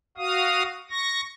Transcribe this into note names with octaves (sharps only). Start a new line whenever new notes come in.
F#4 F5 D#6
C#6 A#6